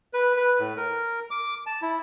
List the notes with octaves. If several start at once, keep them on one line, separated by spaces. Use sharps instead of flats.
B4
B4
A2
A#4
D6
A5
E4